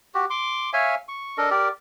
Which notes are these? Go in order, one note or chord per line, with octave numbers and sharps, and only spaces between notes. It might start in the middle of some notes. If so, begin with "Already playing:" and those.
F#4 G4
C6 D6
C#5 E5 F5 G#5
C#6
D4 A4 A#4 D#5
G4 A#4 D5